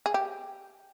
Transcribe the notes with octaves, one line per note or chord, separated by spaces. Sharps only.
G#4
G4